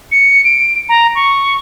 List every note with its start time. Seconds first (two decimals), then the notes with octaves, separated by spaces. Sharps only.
0.12 C#7
0.44 D7
0.89 A#5
1.15 C#6